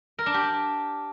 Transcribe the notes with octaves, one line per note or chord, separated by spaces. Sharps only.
A#4
D4
G4